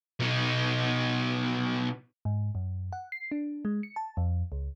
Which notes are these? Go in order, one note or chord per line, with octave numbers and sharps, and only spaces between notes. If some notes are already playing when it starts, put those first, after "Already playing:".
B2 D#4
G#2
F#2
F#5
C7
D4
G#3
C#7
A5
F2
C#2